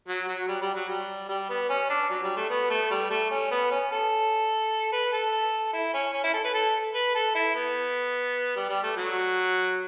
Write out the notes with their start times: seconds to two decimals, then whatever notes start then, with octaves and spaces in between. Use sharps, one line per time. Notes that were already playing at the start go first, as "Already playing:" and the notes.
0.07 F#3
0.28 F#3
0.48 G3
0.62 G3
0.75 F#3
0.89 G3
1.29 G3
1.49 B3
1.69 C#4
1.90 D4
2.10 F#3
2.23 G3
2.36 A3
2.49 B3
2.70 A3
2.90 G3
3.11 A3
3.31 C#4
3.51 B3
3.71 C#4
3.91 A4
4.92 B4
5.12 A4
5.73 E4
5.94 C#4
6.13 C#4
6.24 E4
6.34 A4
6.44 B4
6.54 A4
6.94 B4
7.15 A4
7.35 E4
7.55 B3
8.56 G3
8.69 G3
8.83 A3
8.96 F#3